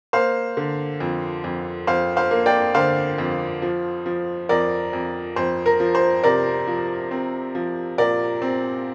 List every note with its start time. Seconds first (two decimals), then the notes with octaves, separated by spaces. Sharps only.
0.13 A#3 C5 F5
0.57 D3
1.00 F2
1.44 F2
1.87 F2 C5 F5
2.17 C5 F5
2.31 A#3
2.46 D5 G5
2.75 D3 C5 F5
3.18 F2
3.62 F3
4.06 F3
4.49 F2 A#4 D5
4.93 F2
5.36 F2 C5
5.66 A#4
5.80 F3
5.95 C5
6.23 C3 A#4 D5
6.67 F3
7.11 C4
7.55 F3
7.98 A#2 A#4 D5
8.42 C4